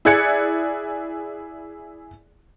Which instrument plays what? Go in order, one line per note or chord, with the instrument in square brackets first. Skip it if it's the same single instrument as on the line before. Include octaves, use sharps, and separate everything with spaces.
[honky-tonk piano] E4 G#4 D5 F#6 G#6 C#7